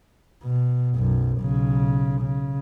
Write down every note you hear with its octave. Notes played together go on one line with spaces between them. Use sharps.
B2
B1 F#2
B1 C#3
C#3